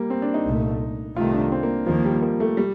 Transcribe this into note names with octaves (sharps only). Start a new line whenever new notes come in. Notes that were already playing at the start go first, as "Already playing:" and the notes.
Already playing: G3 A#3
C4
D4
D#4
C2 A#2 A3
C2 C3 D#3 A3 F4
D4
C4
A#3
D#2 D#3 F3 A#3
G3
A#3
A3
G3